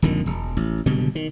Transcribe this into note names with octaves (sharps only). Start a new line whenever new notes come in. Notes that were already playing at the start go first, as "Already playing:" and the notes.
D#1 F2 D3 D#3
E1
A1
F#1 B2 D3 G3
D#3